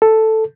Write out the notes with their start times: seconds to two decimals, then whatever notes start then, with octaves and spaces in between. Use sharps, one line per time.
0.02 A4